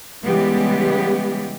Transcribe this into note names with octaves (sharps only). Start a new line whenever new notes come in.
C#3 E3 G3 G#3 B3 G4